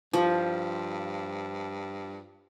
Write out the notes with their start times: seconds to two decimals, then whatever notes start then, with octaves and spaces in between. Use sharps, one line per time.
0.13 G2 F3